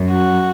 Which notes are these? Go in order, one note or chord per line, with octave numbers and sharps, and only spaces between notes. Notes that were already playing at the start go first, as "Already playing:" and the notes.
Already playing: F#2
F#4